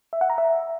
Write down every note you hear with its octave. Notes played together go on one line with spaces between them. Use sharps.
E5
F#5
A#5
E5